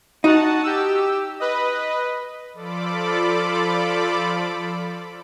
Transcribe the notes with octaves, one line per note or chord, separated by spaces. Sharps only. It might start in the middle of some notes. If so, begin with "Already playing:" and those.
D#4 F#4 F#5 A5
G4 E6
B4 D#5
F3 F4 A4 D5 B5 D6